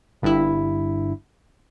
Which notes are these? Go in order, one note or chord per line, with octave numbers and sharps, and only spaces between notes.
G1 G2 E4